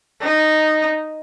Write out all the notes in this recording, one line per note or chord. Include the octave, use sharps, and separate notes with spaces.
D#4